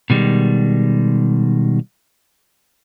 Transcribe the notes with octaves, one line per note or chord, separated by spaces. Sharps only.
B2 D#3 G3 G#3